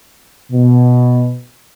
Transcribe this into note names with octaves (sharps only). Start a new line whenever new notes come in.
B2